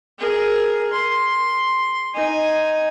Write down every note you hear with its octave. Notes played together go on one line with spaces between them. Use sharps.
G#4 A#4
C6
D#4 G#5